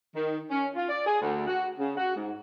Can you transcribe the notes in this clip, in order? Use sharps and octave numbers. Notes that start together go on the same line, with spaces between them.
D#3
C#4
F4
D5
G#4
D2
F#4
C#3
F#4
G#2